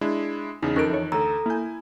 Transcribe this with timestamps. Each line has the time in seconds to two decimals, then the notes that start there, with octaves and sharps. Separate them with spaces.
0.01 G#3 D4 E4
0.63 E2 C#3 D#4
0.76 F2 D#3 C#4 A4 A#4 F#6 D7
0.90 E3 A4 C#5
1.12 D2 A4 A#5 E6
1.46 A#3 E4 G#5 G6